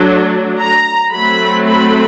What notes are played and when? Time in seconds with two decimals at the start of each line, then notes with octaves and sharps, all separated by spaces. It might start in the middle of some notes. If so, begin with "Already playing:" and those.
Already playing: F#3 A3 D4
0.59 A#5
1.13 F#3 A3 C4 B5
1.67 B5